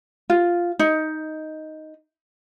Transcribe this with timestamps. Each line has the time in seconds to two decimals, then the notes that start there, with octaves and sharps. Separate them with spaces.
0.30 F4
0.79 D#4